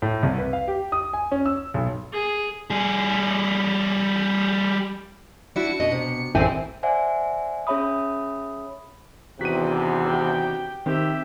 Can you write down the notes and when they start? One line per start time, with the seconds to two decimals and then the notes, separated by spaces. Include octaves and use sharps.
0.02 A2
0.23 C2
0.38 B4
0.53 F5
0.68 G4
0.92 D#6
1.13 G#5
1.31 C#4
1.46 E6
1.74 B1
2.13 G#4
2.70 G3 G#4
5.56 D4 E4 F#4 C#7
5.80 B2 D#5
5.92 C3
6.35 A1 G#2 C4 E4 G#5
6.83 C5 D5 E5 F#5 G#5
7.67 C#4 G#4 C#5 E5 B5 D#6
9.41 E2 C3 D#3 D4 F#4 G5 B6 D#7
10.07 G4 G5
10.86 D#3 C4 G4 E5